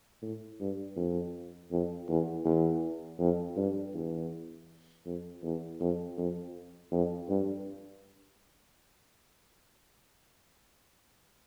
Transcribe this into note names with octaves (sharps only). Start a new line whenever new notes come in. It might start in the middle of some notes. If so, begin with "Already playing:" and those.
A2
G2
F2
F2
E2
E2
F2
G2
E2
F2
E2
F2
F2
F2
G2